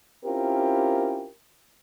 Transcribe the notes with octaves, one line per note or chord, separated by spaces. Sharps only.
C4 C#4 E4 F4 G4 A#4